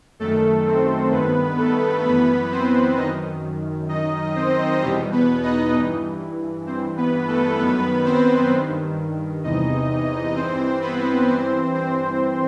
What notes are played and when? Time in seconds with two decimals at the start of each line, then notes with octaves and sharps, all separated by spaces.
0.20 F#2 D#3 A3 A4
0.66 C4 C5
1.12 G2 D#3 B3 B4
1.58 A3 A4
2.04 F#2 E3 B3 B4
2.51 C4 C5
2.97 F#2 D#3 D#4 D#5
3.89 F#2 D#3 D#4 D#5
4.36 C4 C5
4.82 E2 B2 G3 G4
5.12 B3 B4
5.43 D#4 D#5
5.74 G2 E3
6.66 G2 E3 C4 C5
6.97 B3 B4
7.28 A3 A4
7.58 F#2 D#3 B3 B4
8.05 C4 C5
8.51 G2 D#3
9.44 E2 C3 E3 D#4 D#5
10.35 G2 E3 C4 C5
10.82 B3 B4
11.28 G2 E3 C4 C5
11.74 C4 C5